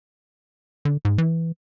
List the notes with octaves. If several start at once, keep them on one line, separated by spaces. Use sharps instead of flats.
D3
G#2
E3